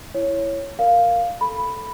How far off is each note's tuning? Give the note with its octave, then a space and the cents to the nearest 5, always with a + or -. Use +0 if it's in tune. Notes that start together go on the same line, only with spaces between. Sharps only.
E4 +15 C#5 +0
A#4 +0 D5 +0 F5 +0
A4 +0 B5 +0